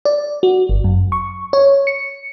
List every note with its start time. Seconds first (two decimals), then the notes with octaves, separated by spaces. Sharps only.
0.05 D5
0.43 F#4
0.69 G1
0.84 F#2
1.12 C#6
1.53 C#5
1.87 C#7